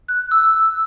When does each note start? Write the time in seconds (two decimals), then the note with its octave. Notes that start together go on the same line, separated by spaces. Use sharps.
0.08 F#6
0.31 E6